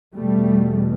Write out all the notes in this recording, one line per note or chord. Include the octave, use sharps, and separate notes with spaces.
E2 B2 G3 A3